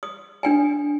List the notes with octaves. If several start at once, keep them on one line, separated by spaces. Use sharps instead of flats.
D#6
D4 G5 G#5